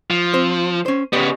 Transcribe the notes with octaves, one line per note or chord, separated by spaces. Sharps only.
F3
C4 C5
C#4 C5
C#3 B3 G4 D5 D#5